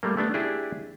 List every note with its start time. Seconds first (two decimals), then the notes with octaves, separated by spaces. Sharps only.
0.03 G3 A3 A#3
0.17 A3 B3 D4
0.34 D4 E4 G4 G#4